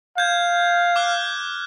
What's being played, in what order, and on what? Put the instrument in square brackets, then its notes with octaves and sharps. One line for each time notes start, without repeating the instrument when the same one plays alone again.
[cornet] F5 [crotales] G6 G#6
[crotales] D6 F6 F#6